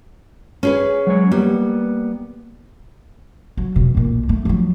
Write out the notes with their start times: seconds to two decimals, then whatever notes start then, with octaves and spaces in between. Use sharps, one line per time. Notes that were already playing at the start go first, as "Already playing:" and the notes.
0.63 C#4 G#4 B4
1.07 F#3 G#3 C#5
1.32 G3 A#3 B3
3.57 F#3
3.75 E1 B2
3.95 B1 A#2
4.29 A3
4.45 F3 F#3